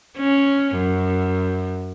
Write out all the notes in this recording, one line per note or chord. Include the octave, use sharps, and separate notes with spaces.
C#4
F#2